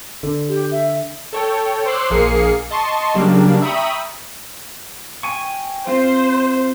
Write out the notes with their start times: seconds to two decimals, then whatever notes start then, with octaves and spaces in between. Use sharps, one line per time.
0.23 D3
0.49 G4
0.71 E5
1.33 A4 C#5 G5
1.85 C5 C#5 C6 D6 E6 F#6
2.10 A#1 A#3 G#4 C7 C#7
2.71 D#5 A5 C6 C#6
3.14 C#3 F#3 G3 A#3 D4
3.62 E5 G5 A#5 B5 C#6 D#6
5.23 G5 G#5 C#6
5.87 C4 F4 C5